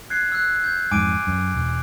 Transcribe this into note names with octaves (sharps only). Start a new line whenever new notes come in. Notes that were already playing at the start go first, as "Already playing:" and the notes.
F#6 G#6 C7
E6 F#6
G6
F2 G#2 G#5 D6 D7
F#2
E1